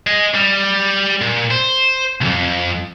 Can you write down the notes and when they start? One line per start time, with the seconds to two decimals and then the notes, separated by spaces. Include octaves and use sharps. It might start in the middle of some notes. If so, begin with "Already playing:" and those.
0.07 D#5 G#5
0.34 G3
1.21 A#2
1.51 C5
2.21 C2 F2